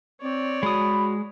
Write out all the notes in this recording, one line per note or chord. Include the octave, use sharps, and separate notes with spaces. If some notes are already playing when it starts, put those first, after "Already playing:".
C4 C#5 D5
G#3 F#4 B5 D#6